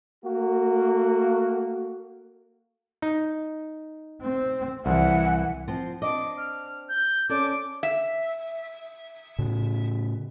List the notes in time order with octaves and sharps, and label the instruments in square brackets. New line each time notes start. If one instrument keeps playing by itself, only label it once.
[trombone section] A3 A#3 F#4
[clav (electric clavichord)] D#4
[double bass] C4
[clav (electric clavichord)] C2 [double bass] E3 [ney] F#5
[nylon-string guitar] F3 C4 F4
[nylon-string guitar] C4 D4 D#5 [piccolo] D6
[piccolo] F6
G6
[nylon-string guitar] C#4 A4 D5 [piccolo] D6
[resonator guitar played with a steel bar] E5
[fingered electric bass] A2 C#3